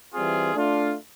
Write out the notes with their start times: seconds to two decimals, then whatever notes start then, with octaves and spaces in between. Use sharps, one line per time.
0.14 E3 G3 C4 F4 G#4
0.55 A3 D4 F4